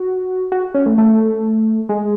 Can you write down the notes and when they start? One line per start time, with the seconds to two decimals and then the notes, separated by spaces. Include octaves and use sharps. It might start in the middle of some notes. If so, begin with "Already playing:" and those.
Already playing: F#4
0.52 F#4
0.74 C#4
0.86 A3
0.98 A3
1.89 G#3